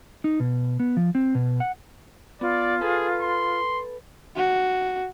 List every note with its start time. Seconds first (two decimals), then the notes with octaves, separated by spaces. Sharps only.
0.24 D#4
0.40 B2
0.80 B3
0.97 F3
1.15 C4
1.35 B2
1.60 F#5
2.41 B3 F4 D5
2.81 G#4 A4 B4
3.21 C6
4.36 F#4